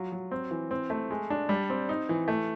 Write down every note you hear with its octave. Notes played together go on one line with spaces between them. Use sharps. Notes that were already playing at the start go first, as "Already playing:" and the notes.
Already playing: F#3 F4
F#3
C4
E3
C4
A3
G#3
D4
G3
C4
D#4
E3
A3